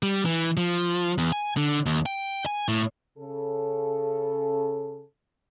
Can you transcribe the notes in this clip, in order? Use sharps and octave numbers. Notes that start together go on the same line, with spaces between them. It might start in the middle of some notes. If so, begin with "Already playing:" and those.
G3
E3
F3
E2
G#5
D3
D#2
G5
G#5
A2
C#3 A4